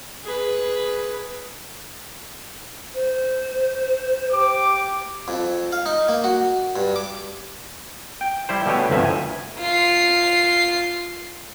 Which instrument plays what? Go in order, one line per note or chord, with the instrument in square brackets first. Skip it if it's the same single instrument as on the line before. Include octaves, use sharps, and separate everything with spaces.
[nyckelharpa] G#4 B4
[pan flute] C5
[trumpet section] G4 D6
[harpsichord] F2
F5
D#4
A#3
F#4
G2
D6
[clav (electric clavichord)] G5
G3 E4 C5
B2 D3 A3 G4 C#5 G#5
G1 D2 G2 C3 F3 E5
G#5
[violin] F4 C7